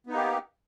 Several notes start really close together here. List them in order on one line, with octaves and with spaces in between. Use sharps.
B3 D#4 A#3 G4